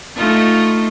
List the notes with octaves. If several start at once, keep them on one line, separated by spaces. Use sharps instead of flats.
A3 D#4 F4